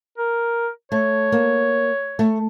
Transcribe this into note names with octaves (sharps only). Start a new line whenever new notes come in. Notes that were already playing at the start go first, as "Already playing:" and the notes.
A#4
A3 C#5
A#3
A3